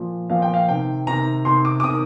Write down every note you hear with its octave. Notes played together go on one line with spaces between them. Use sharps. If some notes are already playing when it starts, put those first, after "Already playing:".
Already playing: A#2 F3
A#2 F3 F5
G5
F5
C3 D#3 G5
C3 D#3 A#5
C3 D#3 C6
D6
D6
C3 D#6
D#3